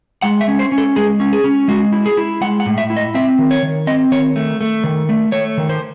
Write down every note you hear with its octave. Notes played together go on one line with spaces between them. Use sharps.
G#3 F#5
E5
C#4
C5
C#4
A4
G#3 G#4
C#4
G#4
C#4
G#3 F#4
E4
G#4
E4
G#3 F#5
F#5
A2
E5
E4
D#5
C4 E5
D#3
C#5
D#3
C4 D#5
D#3 C#5
A3
A3
D#3
A3
A3 C#5
D#3
C5